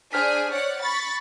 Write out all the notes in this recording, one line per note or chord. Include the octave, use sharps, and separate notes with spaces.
D4 G#4 C5 G#5 F6 B6
C#5 D5 F#5
B5 C#6 A6